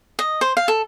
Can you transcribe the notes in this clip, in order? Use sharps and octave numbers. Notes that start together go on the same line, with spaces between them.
D#5
C5
F5
A4